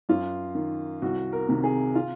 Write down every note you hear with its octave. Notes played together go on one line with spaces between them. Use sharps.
F#2 F4
D#3
C2 F#4
A#4
C3 D#3
G#4
F4